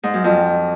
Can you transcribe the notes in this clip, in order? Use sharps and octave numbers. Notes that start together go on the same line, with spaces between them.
G#2
F#2
F2